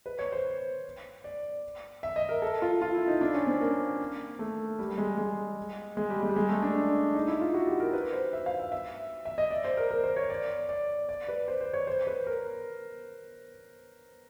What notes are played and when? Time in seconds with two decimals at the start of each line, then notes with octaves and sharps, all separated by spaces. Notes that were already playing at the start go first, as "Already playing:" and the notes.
0.06 B4
0.19 C#5
0.32 C5
1.24 D5
2.03 E5
2.16 D#5
2.29 A#4
2.42 A4
2.62 F4
2.82 F4
2.95 E4
3.08 D#4
3.21 D4
3.34 C#4
3.47 C4
3.61 A#3
4.39 A3
4.79 G3
4.98 G#3
5.17 G#3
5.97 G#3
6.10 G3
6.23 G#3
6.29 G3
6.36 G#3
6.49 A3
6.62 D4
6.75 D4
7.15 D#4
7.28 E4
7.41 F4
7.54 F#4
7.67 G4
7.80 A#4
7.93 B4
8.13 C5
8.33 E5
8.46 F5
8.59 E5
8.72 E5
9.25 E5
9.38 D#5
9.51 D5
9.65 C5
9.77 A#4
9.91 A#4
10.04 C5
10.16 C#5
10.30 D5
10.69 D5
11.09 D5
11.28 B4
11.48 C5
11.61 C5
11.74 C#5
11.87 C5
12.07 B4
12.27 A#4